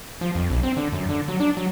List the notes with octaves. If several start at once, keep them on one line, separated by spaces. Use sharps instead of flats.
F3
F2
B1
C4
D3
F#2
D3
F#3
D4
F#3